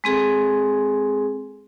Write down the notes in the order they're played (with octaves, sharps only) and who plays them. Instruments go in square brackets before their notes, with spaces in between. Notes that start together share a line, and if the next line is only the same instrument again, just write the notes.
[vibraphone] G#3 C4 G#4 A4